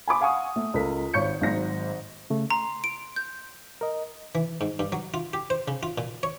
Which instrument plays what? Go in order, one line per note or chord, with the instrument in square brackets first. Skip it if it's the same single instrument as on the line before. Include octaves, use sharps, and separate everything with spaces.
[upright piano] G#5 B5 D6
F5 F#5 G#5 C#6 D#6
A3
C#2 A4 A#4 B6
G#1 C#5 C#6 G6 C#7
G#1 G#2 F#3 A#6
[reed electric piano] C#3 A3
[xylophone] A#5 [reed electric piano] C6
[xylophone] D7
G6
[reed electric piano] A#4 D#5
[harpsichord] E3
G#2
G2
F#3
F4
G4
C5
C#3
F4
A#2
C#5